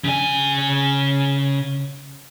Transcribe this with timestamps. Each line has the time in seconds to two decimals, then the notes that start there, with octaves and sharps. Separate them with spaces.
0.04 C#3 G#5